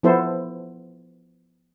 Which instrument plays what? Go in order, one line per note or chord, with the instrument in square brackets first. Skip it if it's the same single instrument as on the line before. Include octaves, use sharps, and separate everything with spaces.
[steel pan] F3 B3 E4 A4 C5